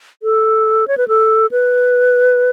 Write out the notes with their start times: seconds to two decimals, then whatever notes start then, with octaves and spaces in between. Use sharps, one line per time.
0.23 A4
0.88 C#5
0.97 B4
1.08 A4
1.51 B4